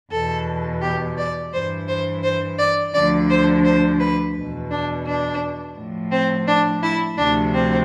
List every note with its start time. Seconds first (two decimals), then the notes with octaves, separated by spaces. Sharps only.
0.12 E2 B2 A4
0.82 G4
1.18 D5
1.53 G2 E3 C5
1.89 C5
2.24 C5
2.59 D5
2.94 D2 D3 F3 D5
3.30 C5
3.65 C5
4.00 B4
4.36 E2 B2
4.71 D4
5.06 D4
5.77 A2 F3
6.12 C4
6.48 D4
6.83 E4
7.18 D2 C3 F3 D4
7.54 C4